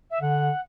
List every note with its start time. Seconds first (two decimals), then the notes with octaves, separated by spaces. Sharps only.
0.10 E5
0.21 D3 F#5